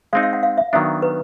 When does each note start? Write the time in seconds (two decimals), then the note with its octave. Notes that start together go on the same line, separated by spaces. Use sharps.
0.13 G#3 C4 D#4 F5
0.23 F5
0.33 F#5
0.43 F5
0.58 E5
0.73 D#3 F#3 B3 D4 E5
1.02 B4